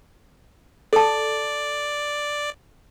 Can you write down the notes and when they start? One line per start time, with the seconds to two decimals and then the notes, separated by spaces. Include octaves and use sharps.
0.93 A4 D5 A5